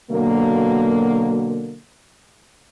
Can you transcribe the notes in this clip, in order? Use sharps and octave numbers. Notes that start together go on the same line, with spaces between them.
B2 D3 F#3 A#3